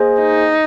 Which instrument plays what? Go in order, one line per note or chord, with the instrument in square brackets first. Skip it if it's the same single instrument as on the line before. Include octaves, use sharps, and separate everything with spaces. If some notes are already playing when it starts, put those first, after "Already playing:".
Already playing: [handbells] A#3 G#4 C5 D#5 G#5
[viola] D#4